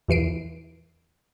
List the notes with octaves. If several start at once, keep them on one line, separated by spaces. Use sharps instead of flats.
E2 E3 C7 D7